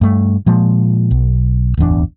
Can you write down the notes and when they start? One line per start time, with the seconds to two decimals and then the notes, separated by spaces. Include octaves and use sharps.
0.01 G2 A3
0.46 A#2 F3 G#3
1.11 B1
1.77 D1 G1 E2 D4